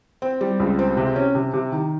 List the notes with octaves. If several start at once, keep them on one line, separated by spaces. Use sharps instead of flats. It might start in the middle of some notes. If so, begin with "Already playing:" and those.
C4
G3
C#2
C4
C3
C#4
C3
C3
D#3